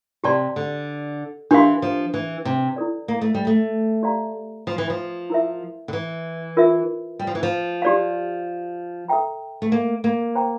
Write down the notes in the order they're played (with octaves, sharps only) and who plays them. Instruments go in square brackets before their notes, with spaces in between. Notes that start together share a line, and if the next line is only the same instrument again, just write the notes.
[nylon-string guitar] C3 [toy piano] G4 D5 A5 C6
[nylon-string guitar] D3
[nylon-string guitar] E3 [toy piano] D4 G4 A#4 F5 C6
[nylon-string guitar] F3
E3
C3
[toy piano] E4 A4 D5
[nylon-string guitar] A#3
A3
G3
A3
[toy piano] G4 D5 F5 A#5
[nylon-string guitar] F3
E3
F3
[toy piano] E4 A#4 E5
[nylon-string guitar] D3
E3
[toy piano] F4 A#4 E5
[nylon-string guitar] G3
F3
E3
F3
[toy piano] G4 D5 F5
A4 E5 G5 A#5
[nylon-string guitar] A3
A#3
A#3
[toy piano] C5 G5 A#5